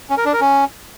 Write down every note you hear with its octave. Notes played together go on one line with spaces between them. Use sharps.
C#4
A#4
D4
A#4
C#4